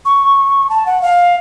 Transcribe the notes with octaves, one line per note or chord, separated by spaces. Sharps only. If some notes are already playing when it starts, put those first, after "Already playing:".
C#6
A5
F#5
F5